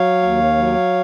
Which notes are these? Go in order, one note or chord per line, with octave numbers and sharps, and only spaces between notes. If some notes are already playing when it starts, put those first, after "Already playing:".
Already playing: F#3 C#5 F5
D#2
F#3